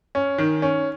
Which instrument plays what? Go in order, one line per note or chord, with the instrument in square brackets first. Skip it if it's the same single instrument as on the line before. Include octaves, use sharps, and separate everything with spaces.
[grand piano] C#4
D#3
C#4